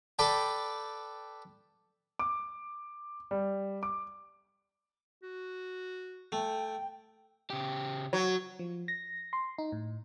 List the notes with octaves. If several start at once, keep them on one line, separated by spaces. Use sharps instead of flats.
A4 B4 D5 G5 A5
D6
G3
D6
F#4
A3 G5
C#3 G4
F#3
F3
A#6
C6
D#4
A2